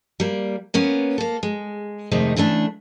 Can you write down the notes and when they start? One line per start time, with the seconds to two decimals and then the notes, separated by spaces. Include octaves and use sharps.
0.20 G3 A#3
0.74 A#3 B3 C#4
1.18 A#3 A4
1.43 G#3
2.11 F2 C3 D#3 G#3 A3 D#4
2.36 C#3 E3 A3 D4